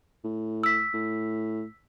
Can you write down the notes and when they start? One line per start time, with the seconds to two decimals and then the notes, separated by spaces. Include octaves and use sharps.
0.24 A2
0.63 E6 B6
0.93 A2